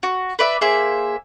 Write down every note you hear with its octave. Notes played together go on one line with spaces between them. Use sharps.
F#4
B4 D5 E5
A#3 G#4 C5 E5